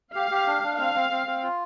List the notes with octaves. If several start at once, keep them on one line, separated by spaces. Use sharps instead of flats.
G4 F5
G4
D4
D4
C4 F5
C4
C4
C4
F4